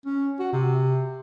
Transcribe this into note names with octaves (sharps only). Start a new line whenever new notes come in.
C#4
F#4
C3